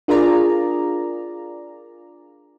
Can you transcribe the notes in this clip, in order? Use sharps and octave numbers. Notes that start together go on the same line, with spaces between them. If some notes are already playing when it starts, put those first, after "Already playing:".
D4 F4 G#4 A#4 D5 A#5